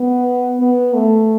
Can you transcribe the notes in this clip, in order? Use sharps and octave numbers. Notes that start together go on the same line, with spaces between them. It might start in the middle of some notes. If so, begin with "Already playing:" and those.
Already playing: B3
B3
A3